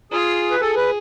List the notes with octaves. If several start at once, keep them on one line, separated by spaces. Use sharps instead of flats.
F4 G#4
B4
G#4 A4
B4